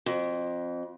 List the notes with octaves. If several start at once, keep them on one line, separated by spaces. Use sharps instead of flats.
F2